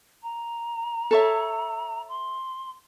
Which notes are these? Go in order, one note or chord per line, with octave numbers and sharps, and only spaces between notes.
A#5
A4 C#5 E5
C6